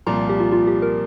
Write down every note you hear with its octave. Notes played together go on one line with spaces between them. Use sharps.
C2 A#2 F3 A#5
G4
F4
F4
G4
A#4